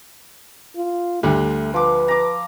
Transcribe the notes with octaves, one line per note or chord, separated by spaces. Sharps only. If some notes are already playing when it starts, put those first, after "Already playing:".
F4
D2 D3 G3 A3
F3 B4 D6
A#5 D6